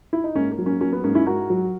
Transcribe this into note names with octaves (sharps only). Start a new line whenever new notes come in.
E4
D#4
G#2 A#3 C#4
A#3
F#3
A#3 C#4
F#3 A#3 C#4
B3
G#2 A#3 C#4
C#4 E4
G#2 F#4 A#4
F#3